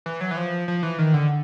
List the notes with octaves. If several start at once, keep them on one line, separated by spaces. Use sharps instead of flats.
E3
F#3
E3
F3
F3
E3
D#3
D3